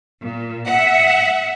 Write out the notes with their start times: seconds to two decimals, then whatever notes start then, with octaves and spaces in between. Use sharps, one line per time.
0.21 A#2
0.65 E5 F#5